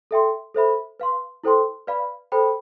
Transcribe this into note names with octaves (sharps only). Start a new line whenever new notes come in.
A4 E5 G5 C6
A4 C5 E5 B5
B4 F5 C6
E4 A4 C5 G5 C6
B4 D5 F5 B5
A4 C5 G5 B5